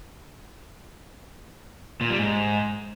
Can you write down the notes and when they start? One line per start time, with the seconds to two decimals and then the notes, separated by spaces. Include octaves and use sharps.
2.01 A#2
2.10 G3
2.19 G#2